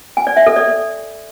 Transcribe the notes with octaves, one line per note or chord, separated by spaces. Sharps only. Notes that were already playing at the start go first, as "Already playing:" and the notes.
G#5
D5
E5
A4
D5